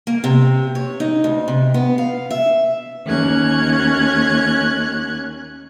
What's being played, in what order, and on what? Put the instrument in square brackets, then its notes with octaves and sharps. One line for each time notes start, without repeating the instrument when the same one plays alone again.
[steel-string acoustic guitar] A#3
C3
C#5
D#4
D2
C3
B3
F5
E5
[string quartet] D#2 C#4 F#6 G#6